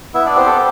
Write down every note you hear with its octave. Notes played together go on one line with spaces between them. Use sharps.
B3 E4 E5
D4 D5
C4 G4 C5
A4